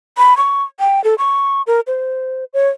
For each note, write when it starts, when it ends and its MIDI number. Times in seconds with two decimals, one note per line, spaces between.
0.18 0.37 83
0.37 0.63 85
0.80 1.03 79
1.04 1.15 69
1.18 1.62 85
1.67 1.80 70
1.87 2.45 72
2.53 2.69 73